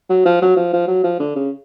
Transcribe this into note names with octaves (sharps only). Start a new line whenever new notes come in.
F#3
F3
F#3
F3
F3
F#3
F3
D3
C#3